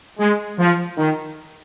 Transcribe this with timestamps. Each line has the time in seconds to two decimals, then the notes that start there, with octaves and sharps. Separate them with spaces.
0.19 G#3
0.59 F3
0.98 D#3